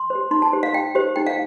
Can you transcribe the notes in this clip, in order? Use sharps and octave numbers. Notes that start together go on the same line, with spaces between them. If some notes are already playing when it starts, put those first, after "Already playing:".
Already playing: C6
C5
G4
D#4 C6
A5
G4 C5
F5
D#4 G5
G4 C5
D#4 G5
F5